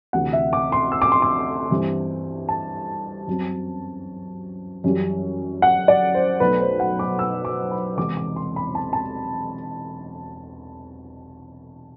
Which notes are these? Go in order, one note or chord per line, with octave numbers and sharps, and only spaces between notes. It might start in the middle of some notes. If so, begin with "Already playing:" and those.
D2 C3 E3 F#5
E5
D6
C6
E6
D6
C6
D6
G2 E3 G3 C4
A5
F#2 F#3 C4
F#2 E3 G3
F#5
D5
C5
B1 B2 A3 B4
C5
F#5
D6
E6
D6
B5
E1 E2 C3 D6
D6
C6
B5
A5
A5